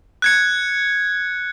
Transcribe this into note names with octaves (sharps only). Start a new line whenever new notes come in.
F#6 G#6 C#7